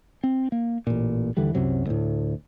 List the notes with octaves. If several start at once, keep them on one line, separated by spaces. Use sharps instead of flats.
C4
A#3
A1 A#2
D#2 D3 E3 G3
C2 F#2 C3 F#3
D2 A2